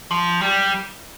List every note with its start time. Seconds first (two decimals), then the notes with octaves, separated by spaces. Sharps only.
0.11 F3
0.41 G3